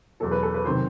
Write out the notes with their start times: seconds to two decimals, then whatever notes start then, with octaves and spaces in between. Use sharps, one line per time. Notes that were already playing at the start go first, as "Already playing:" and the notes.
0.20 E2 B2 F#3 A4
0.32 B4
0.43 A4
0.54 B4
0.65 C3 D#3 F#3 C5